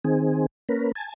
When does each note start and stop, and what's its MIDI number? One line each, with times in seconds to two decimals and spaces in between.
0.05 0.46 51
0.05 0.46 60
0.05 0.46 68
0.69 0.92 58
0.69 0.92 61
0.69 0.92 70
0.69 0.92 71
0.95 1.14 80
0.95 1.14 81